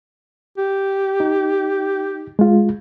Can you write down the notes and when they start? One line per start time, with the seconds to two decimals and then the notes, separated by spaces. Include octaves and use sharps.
0.58 G4
1.20 D#4
2.39 G#3 F4